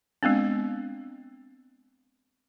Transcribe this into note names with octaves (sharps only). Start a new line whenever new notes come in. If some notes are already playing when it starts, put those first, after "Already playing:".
G#3 B3 C4 D4